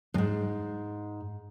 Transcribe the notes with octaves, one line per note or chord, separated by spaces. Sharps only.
F2 G#2